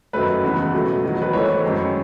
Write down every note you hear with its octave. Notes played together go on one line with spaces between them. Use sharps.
F#2 D#3 F#3 A3 B4
E2 C#3 G#3 B3
B2 F#3 A3
E2 D#3 F#3
B4
G#2 E3 A3 C#5
F#2 D#3 G#3